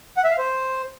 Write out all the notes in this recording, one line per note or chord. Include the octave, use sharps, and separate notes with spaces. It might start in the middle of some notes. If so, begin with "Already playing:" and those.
F#5
E5
F5
C5